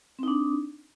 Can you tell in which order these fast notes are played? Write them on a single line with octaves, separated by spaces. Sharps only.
C4 D#4 D4